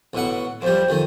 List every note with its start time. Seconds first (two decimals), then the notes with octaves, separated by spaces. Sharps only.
0.13 A1 B2 F#5
0.62 F2 G3 C5
0.89 F2 D#3